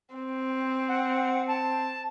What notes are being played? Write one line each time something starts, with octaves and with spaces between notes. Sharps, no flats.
C4
F#5
A5